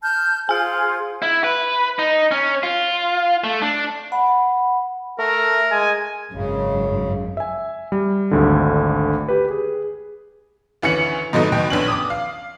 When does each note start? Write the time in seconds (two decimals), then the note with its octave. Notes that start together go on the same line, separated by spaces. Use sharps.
0.02 A5 F6 G6
0.49 F4 G#4 C5 G#5 F6
1.22 E4
1.44 B4
1.99 D#4
2.31 C#4
2.63 F4
3.44 A3
3.62 D4
4.12 F#5 B5
5.19 A3 A#4
5.72 G#3 G#5
6.33 G#1 F#2 C#3
7.37 E5 G#5
7.92 G3
8.31 G#1 D2 D3
9.29 G4 B4
9.51 G#4
10.82 D2 E3 C#4 C#7 F#7
11.33 G#2 B2 F#3 A3 D#4
11.52 F#1 B2 G5
11.70 A#1 B3 C#4 D4 F#7
11.88 D6 D#6
12.10 F5